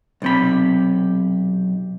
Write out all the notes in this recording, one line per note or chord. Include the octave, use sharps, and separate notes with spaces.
B1 C3 B5